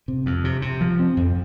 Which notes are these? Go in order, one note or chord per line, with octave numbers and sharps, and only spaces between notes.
C3
F2
C3
C3
F3
C4
F2